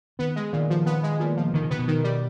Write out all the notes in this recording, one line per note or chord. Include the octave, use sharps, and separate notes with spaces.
D#3 B3
G#3
A#2 D#3
F3
B3
G#3
A#2
F3
D3 D#3
C#3
C3 B3
B2
D#3
G3